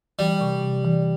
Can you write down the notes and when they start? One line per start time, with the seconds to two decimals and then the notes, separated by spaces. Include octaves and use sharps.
0.19 E3 G3
0.41 C3
0.62 C3
0.85 E3